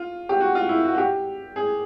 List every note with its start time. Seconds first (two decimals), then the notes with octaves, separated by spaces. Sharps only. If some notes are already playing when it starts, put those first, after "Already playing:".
Already playing: F4
0.29 G4
0.40 F#4
0.55 F4
0.69 E4
0.84 F#4
0.95 F#4
0.98 G4
1.56 G#4